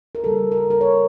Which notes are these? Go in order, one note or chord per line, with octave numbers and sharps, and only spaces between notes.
A#4
C#3 G3 A#3 A4
A#4
A#4
C#5